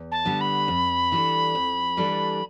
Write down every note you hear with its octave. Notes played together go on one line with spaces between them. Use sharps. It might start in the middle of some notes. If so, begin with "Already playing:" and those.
Already playing: E2
A5
D3 G3 B3
B5
F2
E3 G3 D4 A4
F2
E3 G3 D4 A4